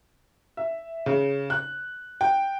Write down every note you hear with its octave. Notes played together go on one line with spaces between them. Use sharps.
E5
C#3
F#6
G5